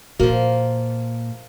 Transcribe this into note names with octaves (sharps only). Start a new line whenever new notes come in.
A#2 F3 A#3 F#4 A#4